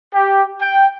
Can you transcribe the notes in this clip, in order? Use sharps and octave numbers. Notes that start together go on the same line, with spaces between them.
G4
G5